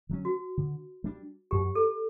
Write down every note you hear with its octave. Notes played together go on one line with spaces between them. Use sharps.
D3 F#3 C#4
F#4
D3
G3 D4
F#2 G4
A4